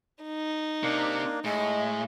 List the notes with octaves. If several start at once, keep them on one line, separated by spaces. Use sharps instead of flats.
D#4
C3 A#3 D4
A2 G#3 D#5